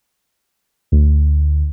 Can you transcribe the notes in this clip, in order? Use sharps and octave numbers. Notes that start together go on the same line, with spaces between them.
D2